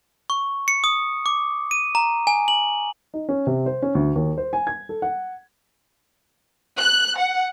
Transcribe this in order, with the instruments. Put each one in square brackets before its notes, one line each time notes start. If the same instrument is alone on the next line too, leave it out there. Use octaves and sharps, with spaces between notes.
[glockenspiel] C#6
C#7
D#6
D6
D#7
A#5
G#5
F#7
[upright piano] D#4
C#4
C3
C5
C#4
D2
D#2
C5
G#5
G#6
A4
F#5
[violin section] F#6
F#5